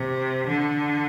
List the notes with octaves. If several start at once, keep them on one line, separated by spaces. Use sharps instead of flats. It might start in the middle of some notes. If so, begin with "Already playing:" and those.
Already playing: C3
D3